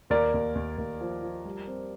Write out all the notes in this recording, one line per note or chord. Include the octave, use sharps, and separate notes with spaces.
D#2 A#4 D5
D#2
D#2
D#2
F3
F3
G3
C4